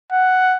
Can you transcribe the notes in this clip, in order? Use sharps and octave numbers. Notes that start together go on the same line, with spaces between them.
F#5